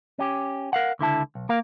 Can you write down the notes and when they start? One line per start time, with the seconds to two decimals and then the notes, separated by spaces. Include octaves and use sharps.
0.19 C#4 G4
0.73 A#4 F5 F#5
0.99 C#2 D3 E4 A5
1.35 B1
1.49 A#3 A#4 F5